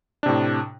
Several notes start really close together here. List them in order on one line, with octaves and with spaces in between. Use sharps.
D4 C3 A2